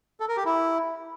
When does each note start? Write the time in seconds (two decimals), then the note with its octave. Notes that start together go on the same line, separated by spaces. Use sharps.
0.20 A4
0.28 A#4
0.37 G4
0.45 E4